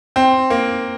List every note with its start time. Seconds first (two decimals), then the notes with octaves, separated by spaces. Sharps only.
0.16 C4
0.50 A#3